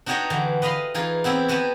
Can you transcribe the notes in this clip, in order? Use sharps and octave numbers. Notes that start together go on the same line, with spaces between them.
D4 D#4 F#4 G4 C#5 D#5
D3 E3
B4 D#5 F5 B5 C6
E3 D#4 F4 G#4
B3 C4 E4 G4
F#4 G4 B4 G#5 A5